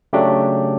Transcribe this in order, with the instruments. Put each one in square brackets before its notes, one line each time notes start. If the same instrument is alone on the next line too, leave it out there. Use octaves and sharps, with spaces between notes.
[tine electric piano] C#3 F#3 A3 D4 G4